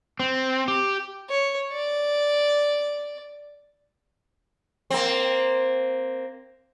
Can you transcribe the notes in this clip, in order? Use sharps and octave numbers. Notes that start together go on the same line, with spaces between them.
C4
G4
C#5
D5
A#3 C4